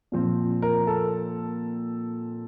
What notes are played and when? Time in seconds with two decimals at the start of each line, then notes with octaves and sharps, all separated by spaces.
0.12 A#2 F3 C4
0.62 A#4
0.87 A4